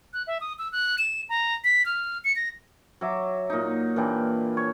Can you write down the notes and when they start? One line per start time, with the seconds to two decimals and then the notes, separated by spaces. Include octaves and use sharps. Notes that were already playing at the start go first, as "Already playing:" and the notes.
0.13 F#6
0.27 E5
0.41 D#6
0.59 E6
0.72 F#6
0.99 E7
1.29 A#5
1.64 B6
1.86 F6
2.24 C#7
2.36 A#6
3.01 F#3 E5 D6
3.50 A#2 D#4
3.96 A#2 E3 D4 G4
4.57 C#5